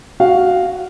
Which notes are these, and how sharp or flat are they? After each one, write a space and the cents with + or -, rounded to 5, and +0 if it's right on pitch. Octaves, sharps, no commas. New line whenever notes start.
F#4 +0 F5 +0